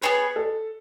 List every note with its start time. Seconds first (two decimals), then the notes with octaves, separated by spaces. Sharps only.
0.01 B3 D4 G#4 B4 C#5
0.36 A4